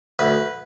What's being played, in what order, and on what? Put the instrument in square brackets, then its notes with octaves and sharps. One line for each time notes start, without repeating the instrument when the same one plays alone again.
[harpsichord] D2 B4